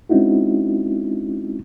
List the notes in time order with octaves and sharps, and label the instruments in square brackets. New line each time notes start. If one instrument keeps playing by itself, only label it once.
[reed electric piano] G#3 C4 C#4 D#4 E4 F#4